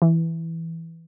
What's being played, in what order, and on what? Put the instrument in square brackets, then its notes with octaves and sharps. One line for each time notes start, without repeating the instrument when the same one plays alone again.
[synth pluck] E3